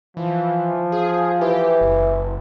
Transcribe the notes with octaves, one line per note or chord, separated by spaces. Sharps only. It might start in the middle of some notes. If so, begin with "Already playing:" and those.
E3 F3
G#4
E3 G4
F#1